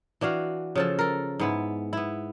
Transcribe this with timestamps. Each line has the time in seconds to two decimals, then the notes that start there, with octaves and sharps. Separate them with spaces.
0.21 E3 D4 F#4 F5
0.76 C#3 F3 A4
0.99 A4 A#4
1.39 G#2 B3 E4
1.93 B3 E4